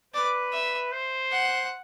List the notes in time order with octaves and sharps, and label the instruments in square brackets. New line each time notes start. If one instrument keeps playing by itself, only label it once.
[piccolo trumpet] B4 [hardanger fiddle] D5
[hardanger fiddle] E5
[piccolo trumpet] C5
[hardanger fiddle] F#5